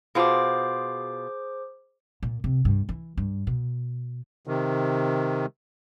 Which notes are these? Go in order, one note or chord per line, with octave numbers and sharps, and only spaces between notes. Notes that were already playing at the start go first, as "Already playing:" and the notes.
B2 F4 G#4 C5 D6
A#2
C3
G2
E3
G2
B2
C3 D#3